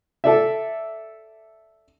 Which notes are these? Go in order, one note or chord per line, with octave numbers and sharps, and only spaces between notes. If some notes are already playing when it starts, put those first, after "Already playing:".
A4 D5 E5